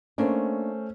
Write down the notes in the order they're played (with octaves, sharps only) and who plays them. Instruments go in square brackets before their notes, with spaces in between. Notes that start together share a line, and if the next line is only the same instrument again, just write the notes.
[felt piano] A3 C#4 C5 [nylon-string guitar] A#3 D4